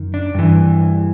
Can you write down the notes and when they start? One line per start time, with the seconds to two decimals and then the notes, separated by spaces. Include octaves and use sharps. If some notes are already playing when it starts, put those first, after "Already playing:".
Already playing: F#2 D#3
0.14 D4
0.34 G2 E3